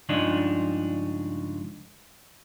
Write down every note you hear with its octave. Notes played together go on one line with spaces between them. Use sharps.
C#2 G2 C#3 F3 D4 D#4